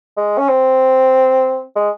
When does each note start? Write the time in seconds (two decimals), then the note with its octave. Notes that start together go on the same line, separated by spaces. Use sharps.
0.17 G#3
0.38 C#4
0.49 C4
1.76 G#3